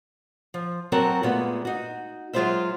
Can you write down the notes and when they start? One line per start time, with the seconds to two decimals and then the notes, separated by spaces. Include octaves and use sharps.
0.54 F3
0.92 F#3 C4 F#4 A4 A#4
1.23 A#2 G#3 A3 B3
1.65 D#4 F#4
2.33 F#3 G#3 F4 G#4 C5 E5